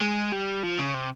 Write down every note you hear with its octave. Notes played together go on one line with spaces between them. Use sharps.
G#3
G3
F3
C#3
C3